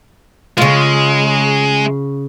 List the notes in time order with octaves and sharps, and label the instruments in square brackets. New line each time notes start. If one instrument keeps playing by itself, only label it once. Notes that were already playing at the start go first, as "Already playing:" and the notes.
[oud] C#3 F4 [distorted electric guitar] G#3